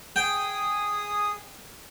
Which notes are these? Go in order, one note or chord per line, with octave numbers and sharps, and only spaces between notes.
G#4 G5 D#6